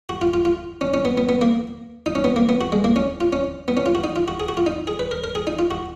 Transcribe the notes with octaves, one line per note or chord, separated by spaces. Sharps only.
F#4
F4
F4
F4
C#4
C#4
B3
B3
B3
A#3
D#4
C#4
B3
A#3
B3
F#4
G#3
A#3
C#4
F4
C#4
B3
C#4
F4
F#4
D#4
F4
F#4
G#4
F#4
F4
D#4
G#4
B4
A#4
A#4
G#4
D#4
F4
F#4